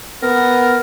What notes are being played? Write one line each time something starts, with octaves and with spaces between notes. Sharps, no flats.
B3 A#4